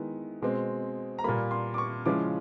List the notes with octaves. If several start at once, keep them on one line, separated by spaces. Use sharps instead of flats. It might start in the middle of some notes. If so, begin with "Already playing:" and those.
Already playing: D#3 G#3 B3 E4
B2 G#3 C4
A#5
A#2 G3 A#3 B5
C6
D6
C#6
C#3 F3 G#3 C#4 E4 D6